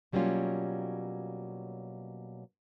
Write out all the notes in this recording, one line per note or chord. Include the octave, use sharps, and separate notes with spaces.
B2 F#3 G3 A#3 C#4 F4